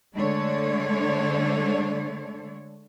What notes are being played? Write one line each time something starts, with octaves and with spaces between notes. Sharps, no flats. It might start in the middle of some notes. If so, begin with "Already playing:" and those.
D3 G#3 A3 D4 C#5